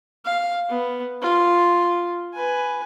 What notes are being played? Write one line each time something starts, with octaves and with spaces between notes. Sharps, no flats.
F5
B3
F4
B4 G#5